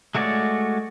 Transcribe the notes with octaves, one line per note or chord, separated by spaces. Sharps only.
G#3 A3 F#4 C#5 D5